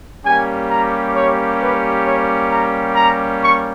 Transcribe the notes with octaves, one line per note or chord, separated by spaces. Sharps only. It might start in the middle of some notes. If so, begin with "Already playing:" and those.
G3 A#3 C#4 G4 G#5
A#5
C#5
B4
C#5
A#5
A#5
C#6